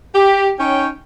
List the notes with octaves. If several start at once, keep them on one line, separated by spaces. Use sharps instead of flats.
G4
C#4 D#4 C#5 G5